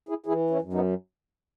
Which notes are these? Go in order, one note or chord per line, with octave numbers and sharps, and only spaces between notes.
E4 G#4
E3 E4 G#4
C#4 E4
F#2
B3 D#4